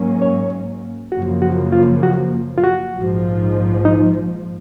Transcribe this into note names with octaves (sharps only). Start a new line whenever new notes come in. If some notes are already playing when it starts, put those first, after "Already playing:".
Already playing: G#2 F#3 A#3 C#4
C#5
F#2 C#3 F3 A#3 F#4
F#4
F4
F#4
F4
F#4
A#1 G#2 F3
D#4